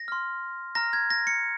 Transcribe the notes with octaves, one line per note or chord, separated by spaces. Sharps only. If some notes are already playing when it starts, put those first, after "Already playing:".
Already playing: A#6
C6 F6
A#5 F6 A#6
G#6
A#6
C#7